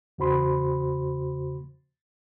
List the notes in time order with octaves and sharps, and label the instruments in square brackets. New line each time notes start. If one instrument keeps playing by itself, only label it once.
[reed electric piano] E2 C#3 F#4 C5 B5 C6